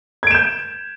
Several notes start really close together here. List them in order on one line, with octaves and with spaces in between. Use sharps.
G#6 D7 E7 G6